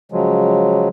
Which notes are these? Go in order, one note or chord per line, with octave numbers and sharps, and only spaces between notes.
C#3 F3 F#3 G#3